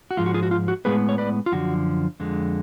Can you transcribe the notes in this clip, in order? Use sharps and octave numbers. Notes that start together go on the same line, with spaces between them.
F#4
G#2 F3 G#3 F4
F#4
F4 G#4
F#4
F4
F#4
A2 G#3 B3 G#4 B4
C#5
B4 D5
F4
F#2 D3 F3 F#4
F2 D3 G#3